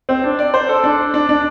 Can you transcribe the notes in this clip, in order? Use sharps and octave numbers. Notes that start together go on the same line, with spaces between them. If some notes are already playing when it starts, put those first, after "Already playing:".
C4
D4
D5
C5
A4
D4
D4
D4